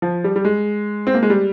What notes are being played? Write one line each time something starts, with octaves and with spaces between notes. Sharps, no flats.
F3
G3
G3
G#3
C4
A#3
G#3
G3